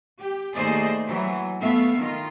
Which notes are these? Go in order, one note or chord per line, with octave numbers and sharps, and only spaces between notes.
G4
D#2 A3 G#4 C5 D5 D#5
E3 F#3
A3 B3 E5 F5
D#3 F4